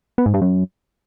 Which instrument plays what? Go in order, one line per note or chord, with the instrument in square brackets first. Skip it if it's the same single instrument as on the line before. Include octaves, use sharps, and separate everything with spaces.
[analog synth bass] B3
G#2
G2
F#2